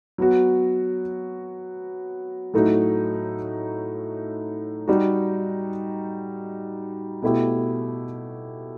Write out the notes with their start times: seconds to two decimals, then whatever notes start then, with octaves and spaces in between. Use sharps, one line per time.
0.18 F#3 B3 F#4
2.54 A2 F#3 A3 D#4 F#4
4.88 G3 D#4 F#4
7.22 B2 A3 E4 G4